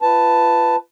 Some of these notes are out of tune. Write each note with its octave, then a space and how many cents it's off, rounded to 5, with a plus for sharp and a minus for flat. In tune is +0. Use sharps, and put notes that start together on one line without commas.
F4 -30 B4 +10 A5 +0